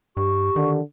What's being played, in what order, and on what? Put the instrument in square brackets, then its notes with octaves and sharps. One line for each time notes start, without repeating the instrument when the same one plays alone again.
[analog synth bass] G2 [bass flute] G4 [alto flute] C#6
[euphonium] D3 [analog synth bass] D#3